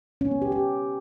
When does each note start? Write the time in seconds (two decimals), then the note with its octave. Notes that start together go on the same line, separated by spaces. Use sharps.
0.21 C#4
0.31 B3
0.42 G4
0.52 G4